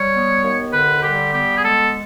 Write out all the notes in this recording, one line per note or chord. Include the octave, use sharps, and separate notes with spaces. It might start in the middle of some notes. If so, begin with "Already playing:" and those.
Already playing: G3 C#5
B3
D#2
D3 B4
G3 G4
B3 G4
G#4
G#3 A4